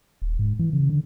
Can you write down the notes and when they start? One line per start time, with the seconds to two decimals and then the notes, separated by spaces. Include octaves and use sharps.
0.22 D#1
0.39 G#2
0.59 E3
0.73 C#3
0.89 D3